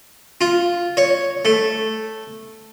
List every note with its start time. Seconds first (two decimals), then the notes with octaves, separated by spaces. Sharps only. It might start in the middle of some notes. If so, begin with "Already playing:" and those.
0.41 F4
0.97 C#5
1.45 A3